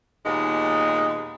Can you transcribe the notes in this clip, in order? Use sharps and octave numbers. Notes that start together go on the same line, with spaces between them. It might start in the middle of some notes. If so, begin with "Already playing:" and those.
D#2 A#2 G#3 B3 D#4